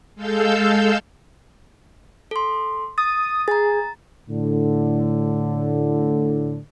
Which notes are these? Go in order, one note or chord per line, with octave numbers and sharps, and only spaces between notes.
G#3 A4 F5 E6 G6
A4 C6
D#6 A6
G#4 A#5 A6
A2 D3